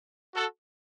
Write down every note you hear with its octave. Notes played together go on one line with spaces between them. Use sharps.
F#4 A4